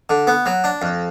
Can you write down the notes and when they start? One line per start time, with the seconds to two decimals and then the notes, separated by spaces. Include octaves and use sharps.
0.10 D3
0.27 B3
0.46 F#3
0.64 D4
0.82 F2